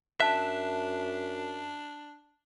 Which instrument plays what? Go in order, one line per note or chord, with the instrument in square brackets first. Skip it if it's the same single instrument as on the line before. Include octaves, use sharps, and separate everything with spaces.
[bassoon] F#2 [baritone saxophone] D4 [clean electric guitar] E5 [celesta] A5 F#6